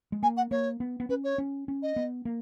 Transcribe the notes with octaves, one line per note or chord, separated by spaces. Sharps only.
G#3
A#3 G#5
F#5
A#3 C#5
B3
B3
C#4 B4
C#5
C#4
C#4
D#5
B3
A#3